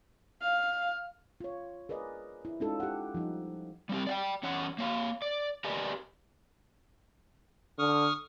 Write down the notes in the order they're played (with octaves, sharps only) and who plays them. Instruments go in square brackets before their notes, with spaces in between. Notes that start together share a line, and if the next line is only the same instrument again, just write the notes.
[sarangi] F5
[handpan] F4 C#5
G#4 A#4 B4 D5 D#5
E4
G#3 C#4 D#4 F4 A4
G4 F#5
F3 G3 D#4
[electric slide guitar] G3 C4 G4
D5 F#5 G5
E2 C#4 C#5 F#5
A#3 C#5 F5
D5
G4 A#4 B4 D5 D#5 G#5
[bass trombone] D3 [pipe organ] C#6 D#6 F6